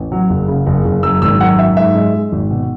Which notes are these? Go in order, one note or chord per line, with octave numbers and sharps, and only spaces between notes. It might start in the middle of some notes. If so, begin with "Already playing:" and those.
Already playing: A1
F#3
F#1
C#3
F#1
F#1
F#2 E6
G#1 E6
F#2 F#5
F#2 E5
G#2 E5
G#3
G#3
G#1
B2